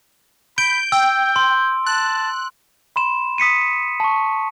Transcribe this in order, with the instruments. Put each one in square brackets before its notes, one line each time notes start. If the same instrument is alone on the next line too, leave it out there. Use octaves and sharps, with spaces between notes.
[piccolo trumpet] B5 [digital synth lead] G6 [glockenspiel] D7
[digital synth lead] G5 [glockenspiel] E6 [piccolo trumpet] G6
[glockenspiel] C6
[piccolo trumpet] A5 [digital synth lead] F#6
[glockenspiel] B5 C6 E7
D#6 B6 C#7 D#7
A5 C#6